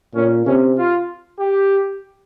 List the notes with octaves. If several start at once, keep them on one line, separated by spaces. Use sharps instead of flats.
A#2 C#4
C3 C#4
F4
G4